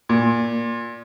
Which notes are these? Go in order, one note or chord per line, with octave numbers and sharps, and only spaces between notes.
A#2